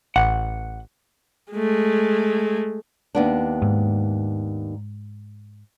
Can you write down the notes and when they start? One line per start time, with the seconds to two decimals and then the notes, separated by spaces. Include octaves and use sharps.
0.16 A1 F#5
1.53 G#3 A3
3.15 D#2 B3 D4
3.62 G#2